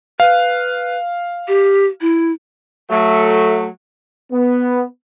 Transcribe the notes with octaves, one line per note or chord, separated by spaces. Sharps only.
B4 F5
G4
E4
F#3 A3
B3